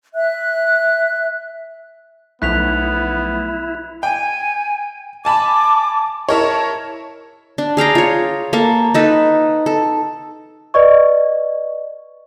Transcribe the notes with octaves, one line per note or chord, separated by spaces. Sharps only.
E5 F#6
B1 F3 A3 B3 E4 F#6 B6 F7
G5 G#5
G#5 A5 B5 D6
E4 A#4 C#5 A5
D4
G#4 F5 G5 A#5
F4 C#5
A#3 A4 F5
D#4 A4 B4
A4
B4 D5 D#5 C#6